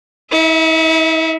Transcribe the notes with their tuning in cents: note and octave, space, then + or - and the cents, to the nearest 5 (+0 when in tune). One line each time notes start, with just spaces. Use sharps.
E4 -45 E5 +0